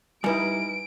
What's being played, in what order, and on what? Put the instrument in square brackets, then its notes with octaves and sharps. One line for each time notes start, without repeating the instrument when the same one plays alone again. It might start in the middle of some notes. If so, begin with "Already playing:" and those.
[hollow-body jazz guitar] G3 E4 [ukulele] D#4 A#4 [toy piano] B4 G#5 [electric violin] D7